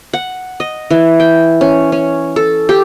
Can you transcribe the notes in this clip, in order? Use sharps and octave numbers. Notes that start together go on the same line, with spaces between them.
F#5
D#5
E3
G5
C#4
C#4
A4
G4